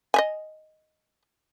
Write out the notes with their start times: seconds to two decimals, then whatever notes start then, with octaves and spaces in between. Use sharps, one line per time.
0.14 D#5 E5 G#5